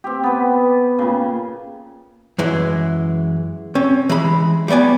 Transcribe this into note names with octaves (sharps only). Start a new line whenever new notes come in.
C4 G4
B3 B4
A#2 C#3
F#2 E3 G#3
C4 C#4
E3 G#3 B5
G3 A3 B3 D5 G#5